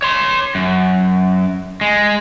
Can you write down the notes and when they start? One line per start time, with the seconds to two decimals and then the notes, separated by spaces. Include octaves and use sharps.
0.02 C#5 C6
0.55 F#2
1.81 G#3